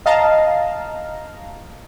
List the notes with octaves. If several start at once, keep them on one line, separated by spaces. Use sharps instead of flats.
D#5 F5 A5 A#5